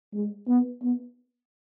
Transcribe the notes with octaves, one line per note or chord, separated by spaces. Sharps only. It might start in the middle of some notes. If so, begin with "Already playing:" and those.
G#3
B3
B3